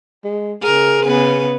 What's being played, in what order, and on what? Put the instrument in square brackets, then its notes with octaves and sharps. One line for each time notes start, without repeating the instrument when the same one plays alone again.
[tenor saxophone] G#3
[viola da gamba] C#3 A#4 [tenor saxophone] G#4
[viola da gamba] C#3 B3 B4